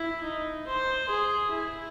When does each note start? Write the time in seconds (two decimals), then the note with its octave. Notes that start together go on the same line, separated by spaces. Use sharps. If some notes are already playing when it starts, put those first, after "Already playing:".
Already playing: E4
0.24 D#4
0.67 C5
1.09 G#4
1.52 E4